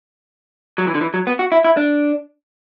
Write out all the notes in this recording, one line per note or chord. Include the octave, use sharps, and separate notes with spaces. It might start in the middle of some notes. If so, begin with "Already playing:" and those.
F#3
E3
D3
E3
F#3
B3
F#4
E4
E4
D4